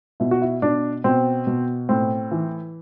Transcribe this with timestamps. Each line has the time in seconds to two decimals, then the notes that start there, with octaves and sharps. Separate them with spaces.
0.20 B2 E4
0.31 F#4
0.42 E4
0.62 B2 D4
1.04 B2 C4
1.47 B2
1.89 A2 C4
2.31 E3